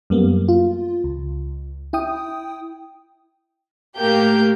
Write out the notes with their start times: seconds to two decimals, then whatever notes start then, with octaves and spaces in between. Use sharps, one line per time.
0.10 F#2 G3 A#3 B3
0.48 F4
1.04 C#2
1.93 E4 G5 D#6
3.97 A2 A3 A#3 G4 G6